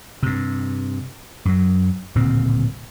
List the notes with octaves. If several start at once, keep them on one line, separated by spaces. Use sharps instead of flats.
G2 C3
F#2 F#3
D1 A#2 C#3 C4